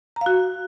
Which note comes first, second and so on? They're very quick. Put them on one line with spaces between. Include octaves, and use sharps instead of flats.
A#5 F5 F#4